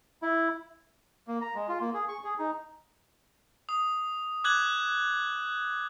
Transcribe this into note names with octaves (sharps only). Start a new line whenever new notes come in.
E4
A#3
A#5
G#3
F4
A#3
G#4
C#6
G#4
D#4
D#6
D6 F#6 G#6 F#7